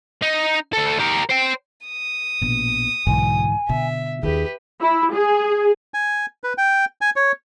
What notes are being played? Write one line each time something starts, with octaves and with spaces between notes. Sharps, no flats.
D#4
D2 A4
G4 A#4
C5 G5
D#6
A#1 B2 D4
B1 G#2 D3 E3 G#5
B2 D3 E5
D#2 D#3 F4 G4 G#4 B4
E4
G#4
G#5
B4
G5
G#5
C#5